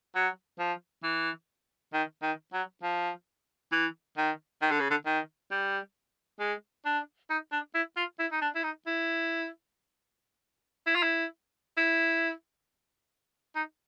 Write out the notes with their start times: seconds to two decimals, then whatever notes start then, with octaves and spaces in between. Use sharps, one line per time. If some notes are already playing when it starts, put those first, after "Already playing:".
0.15 F#3
0.59 F3
1.03 E3
1.93 D#3
2.23 D#3
2.53 F#3
2.83 F3
3.72 E3
4.17 D#3
4.62 D#3
4.71 D3
4.80 C#3
4.90 D3
5.06 D#3
5.51 G3
6.40 G#3
6.85 D4
7.30 D#4
7.52 D4
7.75 E4
7.97 F4
8.19 E4
8.32 D#4
8.42 D4
8.55 E4
8.63 D#4
8.87 E4
10.87 E4
10.95 F4
11.03 E4
11.77 E4
13.55 D#4